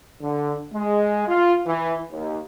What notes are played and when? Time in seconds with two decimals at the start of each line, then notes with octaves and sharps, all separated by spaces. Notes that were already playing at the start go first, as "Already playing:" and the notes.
0.22 D3
0.73 G#3
1.27 F4
1.66 E3
2.12 D#2